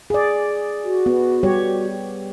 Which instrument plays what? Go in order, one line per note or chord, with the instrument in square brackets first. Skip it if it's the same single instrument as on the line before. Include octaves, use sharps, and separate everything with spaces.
[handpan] G#4 D5
[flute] F#4
[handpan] B3
G3 G4 C#5